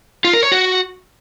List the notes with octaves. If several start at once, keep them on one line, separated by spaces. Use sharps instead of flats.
F4
A#4
C#5
F#4